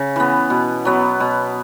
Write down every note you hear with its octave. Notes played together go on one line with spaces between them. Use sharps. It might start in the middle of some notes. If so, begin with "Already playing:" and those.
Already playing: C#3
E3 B3
B2
F#3 B3
B2